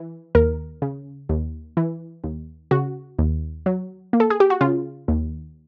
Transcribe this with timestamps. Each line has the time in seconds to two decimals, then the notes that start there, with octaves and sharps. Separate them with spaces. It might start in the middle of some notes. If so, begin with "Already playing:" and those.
Already playing: E3
0.35 D#2 A#4
0.82 C#3
1.29 D#2
1.77 E3
2.24 D#2
2.71 C#3 F#4
3.19 D#2
3.66 F#3
4.13 A#3
4.20 A4
4.30 G#4
4.40 G4
4.50 F#4
4.61 C#3 F4
5.08 D#2